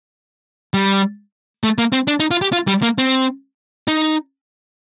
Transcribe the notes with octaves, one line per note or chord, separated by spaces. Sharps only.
G3
A3
A#3
C4
D4
D#4
F4
G4
F4
G3
A#3
C4
D#4